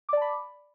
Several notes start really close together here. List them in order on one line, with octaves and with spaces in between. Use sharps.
D6 D5 A5 B5